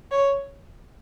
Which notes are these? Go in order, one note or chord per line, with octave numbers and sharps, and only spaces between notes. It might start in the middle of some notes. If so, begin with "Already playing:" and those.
C#5